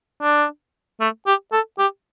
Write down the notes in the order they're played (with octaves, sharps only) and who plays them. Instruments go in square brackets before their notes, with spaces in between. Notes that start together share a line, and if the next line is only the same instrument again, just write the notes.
[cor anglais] D4
A3
G4
A4
G4